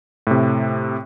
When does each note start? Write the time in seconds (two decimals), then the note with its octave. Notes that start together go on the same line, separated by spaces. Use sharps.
0.27 A2 C3